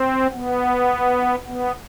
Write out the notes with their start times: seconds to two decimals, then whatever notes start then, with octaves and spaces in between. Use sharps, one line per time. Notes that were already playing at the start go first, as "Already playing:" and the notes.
Already playing: C4
0.32 B3
1.46 B3